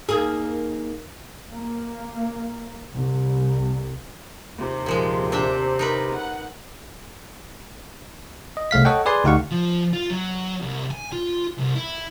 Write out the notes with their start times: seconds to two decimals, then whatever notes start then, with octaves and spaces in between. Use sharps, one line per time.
0.09 D#2 A#3 G#4
1.52 A#3
2.92 C2
4.54 D#2 C3
4.86 A#2 F3 G#3
5.32 C4 D4 E5
5.79 D#4 A#4 B4
6.17 F#5
8.57 D#5
8.71 C2 A3 F5 B6
8.85 A4 C#5 D#5 F#5 G5
9.05 G#4 B4 D5 G#5 C6
9.24 D2 D#4 G4 F5 F#5 C#6
9.51 F3
9.93 F4
10.10 F#3
10.62 C2
10.91 G#5
11.12 F4
11.58 C2
11.76 E4